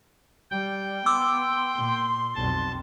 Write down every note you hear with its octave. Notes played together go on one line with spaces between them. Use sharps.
G3 G5
B3 C6 D6 E6
A#2
B1 F2 A5